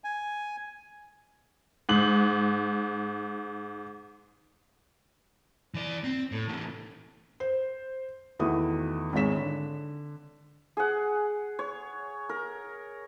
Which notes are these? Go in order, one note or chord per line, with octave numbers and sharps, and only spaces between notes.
G#5
G#2 F#7
E3 D5
C4
A2
C#3 E3
C5
E2 D#3 A3 E4 F#4 D#6
G#1 G#2 G#3 C#5 B6 E7
D3
G#4 F#5
C#5
A#4